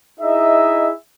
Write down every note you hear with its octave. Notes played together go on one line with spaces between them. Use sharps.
D#4 E4 G#4 D#5 E5